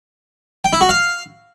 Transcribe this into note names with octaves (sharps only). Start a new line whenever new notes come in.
G5
E4
F#4
F5